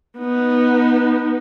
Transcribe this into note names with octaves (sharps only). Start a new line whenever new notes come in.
B3 D#4